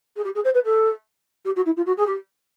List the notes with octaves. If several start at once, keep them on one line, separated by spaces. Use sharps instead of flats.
G#4
G4
G#4
C5
B4
A4
G4
F#4
E4
F4
F#4
G#4
G4